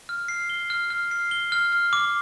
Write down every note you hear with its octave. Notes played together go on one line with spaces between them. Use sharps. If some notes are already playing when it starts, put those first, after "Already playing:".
F6
C7
G7
F6
F6
C7
G7
F6
F6
D6